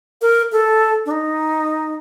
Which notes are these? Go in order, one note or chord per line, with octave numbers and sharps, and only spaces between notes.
A#4
A4
D4
D#4